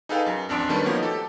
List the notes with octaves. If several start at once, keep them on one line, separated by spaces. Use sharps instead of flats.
D#4 G#4 A4 B4 F5 G5
F#2
A1 F2 D4 A5 C6 D7
D#3 G3 A3 C#4 B4
F3 A#3 B3 D#4 F#4 C#5
G4 A4